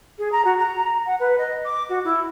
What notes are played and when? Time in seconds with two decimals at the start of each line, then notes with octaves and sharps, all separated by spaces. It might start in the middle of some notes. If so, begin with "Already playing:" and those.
0.18 G#4
0.32 A#5
0.44 F#4
0.59 A#5
1.06 F#5
1.19 B4
1.38 D#5
1.64 D6
1.89 F#4
2.04 E4